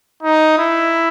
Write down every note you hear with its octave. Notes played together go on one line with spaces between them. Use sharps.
D#4
E4